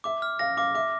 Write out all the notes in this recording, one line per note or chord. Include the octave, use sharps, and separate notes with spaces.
E5 D6
F6
F5 A#6
F5 D6
E5 D6